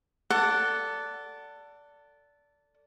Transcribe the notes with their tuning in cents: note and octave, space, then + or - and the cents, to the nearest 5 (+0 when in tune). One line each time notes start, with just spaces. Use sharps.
A4 +20 D5 -15 F#5 +0